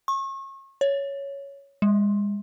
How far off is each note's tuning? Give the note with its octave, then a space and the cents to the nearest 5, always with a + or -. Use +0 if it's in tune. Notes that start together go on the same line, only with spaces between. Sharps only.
C#6 -35
C#5 +5
G#3 -35